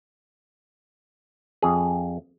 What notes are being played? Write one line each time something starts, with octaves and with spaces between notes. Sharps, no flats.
F2 G#4